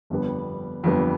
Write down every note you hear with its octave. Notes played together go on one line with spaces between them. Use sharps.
G1 F2 D3 G3 B3
G1 F2 D3 G3 B3